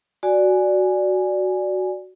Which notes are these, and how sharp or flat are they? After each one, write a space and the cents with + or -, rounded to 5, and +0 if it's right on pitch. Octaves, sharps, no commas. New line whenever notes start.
F#4 +0 D5 +0 G#5 +0